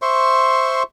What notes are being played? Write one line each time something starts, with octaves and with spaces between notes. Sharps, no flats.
C5 E5 C6 C#6